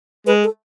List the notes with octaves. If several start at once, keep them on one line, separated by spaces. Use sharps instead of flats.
G#3 B4
A4